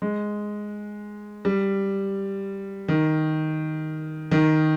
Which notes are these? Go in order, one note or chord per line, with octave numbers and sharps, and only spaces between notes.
G#3
G3
D#3
D#3